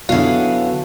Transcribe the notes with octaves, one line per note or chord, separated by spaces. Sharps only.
F#2 D3 F#3 B3 E4 F#4 F5